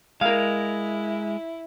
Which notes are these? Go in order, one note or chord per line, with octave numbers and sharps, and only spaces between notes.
G#3 E4 A#4 F5